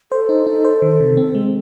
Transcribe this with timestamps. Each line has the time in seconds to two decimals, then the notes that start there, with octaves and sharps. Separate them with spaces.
0.12 A4 C5
0.29 D#4
0.47 D#4
0.65 C5
0.82 D#3
1.00 C3
1.17 C4
1.35 G#3